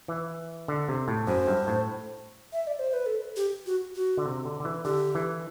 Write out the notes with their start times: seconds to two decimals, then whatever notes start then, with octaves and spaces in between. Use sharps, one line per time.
0.08 E3
0.68 D3
0.88 C3
1.08 A2
1.27 F#2 C5
1.48 G2
1.67 A2
2.53 E5
2.67 D5
2.79 C5
2.93 B4
3.06 A4
3.36 G4
3.66 F#4
3.95 F#4
4.17 D3
4.26 C3
4.45 D3
4.60 D3
4.65 E3
4.85 D3 G4
5.15 E3